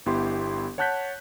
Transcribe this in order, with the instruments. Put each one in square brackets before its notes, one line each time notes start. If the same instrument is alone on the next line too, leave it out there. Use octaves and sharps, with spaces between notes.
[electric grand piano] G1 B3 E4 G4 C6
C#5 F#5 A5 F#6 G6 B6